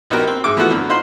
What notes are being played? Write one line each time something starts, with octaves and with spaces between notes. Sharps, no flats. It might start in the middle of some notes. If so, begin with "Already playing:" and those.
A#1 B3 D#4 F#4 G4 A#4
C4
G#2 G#3 E5 D6
E3 F3 A3 B3 E4 F#4
F#2 D3 B3
D#4 F4 C5 F#5 B5 C6